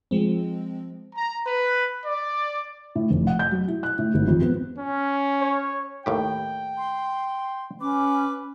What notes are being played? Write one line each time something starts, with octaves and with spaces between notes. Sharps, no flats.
F3 G#3 C4
A#5
B4
D5
A2
F1
F#5
G6
F#3
E4
F#6
A2
G#1
F2
B3
C#4
C#5
D#2 A2 G4 G5
C6
C#4 B4 D6